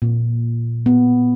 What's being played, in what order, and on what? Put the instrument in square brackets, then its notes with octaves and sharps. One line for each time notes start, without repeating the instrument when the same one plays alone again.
[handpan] A#2
B3